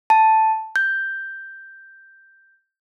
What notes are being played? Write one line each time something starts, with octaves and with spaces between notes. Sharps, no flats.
A5
G6